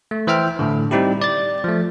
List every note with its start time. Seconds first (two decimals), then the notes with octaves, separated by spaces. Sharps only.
0.11 A3
0.27 E3 C5 E5 G5 F6
0.59 A2 D3
0.91 G3 C4 D#4 E4 G4
1.21 D5 A6
1.64 F3 A3